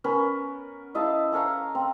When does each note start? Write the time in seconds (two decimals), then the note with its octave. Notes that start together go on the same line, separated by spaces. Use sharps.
0.04 B3 C#4 A#4 B4
0.95 E4 D#5 F5 A5
1.32 C#4 A4 F5 A#5
1.75 C4